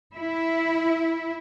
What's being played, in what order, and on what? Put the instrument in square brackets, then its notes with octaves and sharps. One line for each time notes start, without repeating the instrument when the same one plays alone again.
[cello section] E4